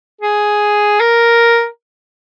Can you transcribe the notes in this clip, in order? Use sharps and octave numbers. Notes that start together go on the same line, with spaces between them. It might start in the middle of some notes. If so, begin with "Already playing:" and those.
G#4
A#4